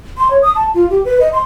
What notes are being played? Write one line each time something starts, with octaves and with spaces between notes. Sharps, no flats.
C6
C#5
D#6
A5
F4
G4
B4
D#5
C6